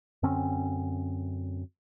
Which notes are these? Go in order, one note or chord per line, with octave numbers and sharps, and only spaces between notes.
F#2 D3 C4 C#4